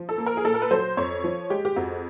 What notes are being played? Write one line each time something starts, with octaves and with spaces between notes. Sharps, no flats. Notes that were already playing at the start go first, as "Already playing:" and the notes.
Already playing: F3
A4
A#3
A#4
G#4
A#2 A4
A#4
B4
F#3 C5
F2 C#5
F3
G#3 G4
G4
F2 F#4